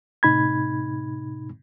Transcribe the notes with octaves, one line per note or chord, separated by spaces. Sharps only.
A2 C3 D#4 B5 G#6